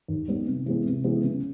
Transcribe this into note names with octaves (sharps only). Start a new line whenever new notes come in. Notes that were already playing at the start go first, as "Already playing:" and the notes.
D#2
D#3 G3 B3
C3
E3 G#3 B3
C3
E3 G#3 B3
C#3